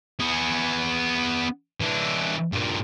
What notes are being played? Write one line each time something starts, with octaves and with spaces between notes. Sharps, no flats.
B3 G#4
E3 D4
G2 A#2